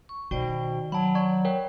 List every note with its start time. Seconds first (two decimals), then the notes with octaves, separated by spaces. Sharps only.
0.09 C#6
0.31 B2 D#3 F#4 C5 D5 G5
0.92 F#3 F#5 A5 B5
1.15 D5 C#6 G#6
1.45 A#4 C#5 G5